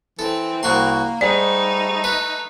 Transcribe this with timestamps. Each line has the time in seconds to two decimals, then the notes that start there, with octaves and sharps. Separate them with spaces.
0.19 E3 C4 A4
0.63 C2 A#3 F#4 C6
1.21 G#2 G3 A3 D#4 D5
2.04 B4